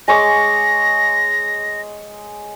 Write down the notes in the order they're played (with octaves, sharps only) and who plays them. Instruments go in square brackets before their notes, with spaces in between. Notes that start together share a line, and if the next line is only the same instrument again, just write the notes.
[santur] G#3 C#5 D6 [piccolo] A#6